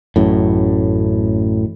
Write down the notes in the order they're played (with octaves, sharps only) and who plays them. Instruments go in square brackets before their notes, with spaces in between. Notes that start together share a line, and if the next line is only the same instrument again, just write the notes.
[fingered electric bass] A1 F#2 A2